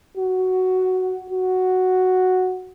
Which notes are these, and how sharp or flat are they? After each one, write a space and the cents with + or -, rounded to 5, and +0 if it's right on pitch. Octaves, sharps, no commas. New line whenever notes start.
F#4 +5
F#4 +0